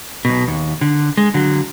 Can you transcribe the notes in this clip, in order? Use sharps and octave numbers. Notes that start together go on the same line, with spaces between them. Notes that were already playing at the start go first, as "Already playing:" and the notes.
B1 B2
D#2
D3
G#3
D3 F#3